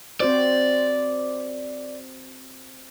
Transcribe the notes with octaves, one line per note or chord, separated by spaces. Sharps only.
C4 F#4 C5 D5